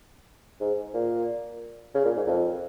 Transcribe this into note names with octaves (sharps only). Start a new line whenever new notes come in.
G#2
A#2
C#3
A#2
G#2
F2